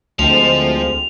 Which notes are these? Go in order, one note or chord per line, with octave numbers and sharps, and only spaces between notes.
D2 F3 G#3 C4 F7